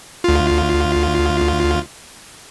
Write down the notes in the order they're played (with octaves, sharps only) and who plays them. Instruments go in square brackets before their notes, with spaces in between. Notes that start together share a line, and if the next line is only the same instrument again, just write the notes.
[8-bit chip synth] D2 F4